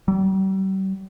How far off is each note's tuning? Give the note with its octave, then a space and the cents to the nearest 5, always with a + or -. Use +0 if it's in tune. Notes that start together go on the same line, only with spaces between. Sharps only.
G3 -40